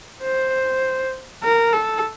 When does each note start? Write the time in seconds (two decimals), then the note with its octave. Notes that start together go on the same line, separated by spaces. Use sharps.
0.23 C5
1.43 A#4
1.73 A4